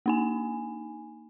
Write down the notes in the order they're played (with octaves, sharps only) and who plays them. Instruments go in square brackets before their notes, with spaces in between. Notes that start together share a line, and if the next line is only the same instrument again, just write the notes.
[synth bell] A#3 D#4 G#5